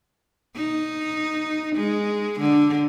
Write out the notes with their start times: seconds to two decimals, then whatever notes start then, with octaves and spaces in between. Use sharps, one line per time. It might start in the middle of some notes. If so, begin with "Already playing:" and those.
0.56 D#4
1.76 G#3
2.40 D3